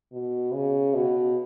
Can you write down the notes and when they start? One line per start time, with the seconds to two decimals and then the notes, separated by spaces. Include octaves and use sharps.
0.12 B2
0.53 C#3
0.94 B2